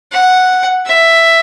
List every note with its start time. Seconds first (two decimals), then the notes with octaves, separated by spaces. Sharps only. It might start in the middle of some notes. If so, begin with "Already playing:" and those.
0.12 F#5
0.87 E5